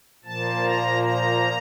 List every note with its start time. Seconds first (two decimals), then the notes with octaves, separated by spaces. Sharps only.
0.24 A#2 F3 A#3 A5
0.64 A#5
1.02 A#5